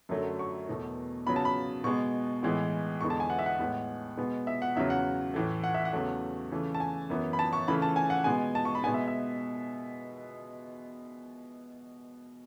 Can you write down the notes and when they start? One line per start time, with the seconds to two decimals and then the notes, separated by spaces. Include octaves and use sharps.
0.09 F#2 D3 F#3 A3
0.39 C#6
0.68 E2 B2 A3
1.27 C#3 F#3 B3 B5
1.36 A5
1.45 B5
1.84 B2 G#3 B3 C#6
2.43 A2 E3 G#3 B3
3.01 E2 D3 G#3 B3 C#6
3.10 A5
3.20 G#5
3.30 F#5
3.39 E5
3.46 F#5
3.59 A2 G#3 B3
4.17 B2 G#3 B3
4.47 E5
4.62 F#5
4.76 E2 C#3 F#3 E5
4.90 F#5
5.34 A2 E3 A3
5.64 F#5
5.74 E5
5.85 F#5
5.93 E2 C#3 F#3 A3
6.51 C#3 E3 A3
6.75 A5
6.80 G#5
7.10 F#2 E3 B3
7.33 B5
7.39 A5
7.53 C#6
7.68 C#3 E3 A3 B5
7.82 A5
7.96 G#5
8.10 F#5
8.24 B2 G#3 B3 G#5
8.55 A5
8.65 C#6
8.75 B5
8.83 B3 G#5
8.86 B2 G#3
8.94 E5
9.08 E5